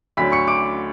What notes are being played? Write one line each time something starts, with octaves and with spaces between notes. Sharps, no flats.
D2 D3 F#3 B5 B6
C#6 C#7
D6 D7